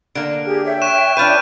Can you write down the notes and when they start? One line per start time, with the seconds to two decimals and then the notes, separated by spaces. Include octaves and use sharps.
0.15 D3 A#3 D7
0.45 G4 G#4
0.64 C#5 E5 G5
0.82 C#6 F#6 E7
1.17 D4 F4 B4 G6 D#7